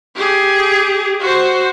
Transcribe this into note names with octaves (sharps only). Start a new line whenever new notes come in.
G4 G#4
F#4 C5